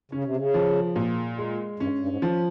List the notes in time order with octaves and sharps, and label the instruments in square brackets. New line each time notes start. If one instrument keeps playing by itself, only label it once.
[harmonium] C#3 [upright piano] C#4
[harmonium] C3
C#3
[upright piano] F3
A#2
G#3
[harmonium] G2 [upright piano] C#4
[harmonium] G2
G#2
[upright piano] F3